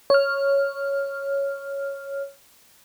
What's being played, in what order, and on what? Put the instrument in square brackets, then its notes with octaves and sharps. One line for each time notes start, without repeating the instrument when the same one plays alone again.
[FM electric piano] C#5 F6